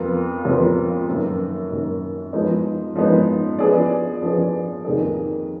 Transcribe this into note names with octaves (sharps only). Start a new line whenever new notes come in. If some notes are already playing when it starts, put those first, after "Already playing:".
Already playing: F2 F3 B3 F4 A#4
F2 F3 B3 F4 A#4
F#2 D#3 A#3
F#2 D#3 A#3
F3 G#3 B3 D#4
F3 G#3 B3 D#4
F3 B3 D4 G#4 D5
F3 B3 D4 G#4 D5
F2 D#3 A#3 D#4 G#4